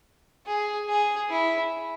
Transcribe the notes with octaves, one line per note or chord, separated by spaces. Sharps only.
G#4
G#4
E4